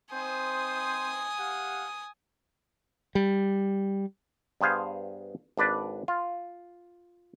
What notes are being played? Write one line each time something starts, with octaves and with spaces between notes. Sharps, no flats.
C4 D#4 C5 G#5 D#6
G4 F5 F#5
G3
G2 B3 G#4 C5 F5 G#5
G#1 D4 B4 D5
F4